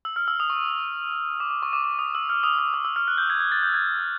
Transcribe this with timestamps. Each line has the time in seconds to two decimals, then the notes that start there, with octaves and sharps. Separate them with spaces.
0.05 E6
0.16 F6
0.28 E6
0.40 D#6
0.50 C#6
1.40 D6
1.50 D6
1.63 C#6
1.73 D6
1.84 D6
1.99 D#6
2.15 E6
2.29 F6
2.43 D#6
2.59 D#6
2.74 E6
2.85 E6
2.96 F6
3.08 F#6
3.18 G6
3.30 G#6
3.40 G#6
3.52 A6
3.63 G6
3.74 G#6